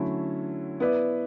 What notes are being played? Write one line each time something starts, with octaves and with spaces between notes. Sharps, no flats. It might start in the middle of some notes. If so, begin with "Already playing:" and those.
Already playing: D3 F#3 A3 C#4 E4
B3 E4 B4 D5